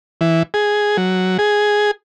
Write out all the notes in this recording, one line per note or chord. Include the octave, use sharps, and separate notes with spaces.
E3
G#4
F#3
G#4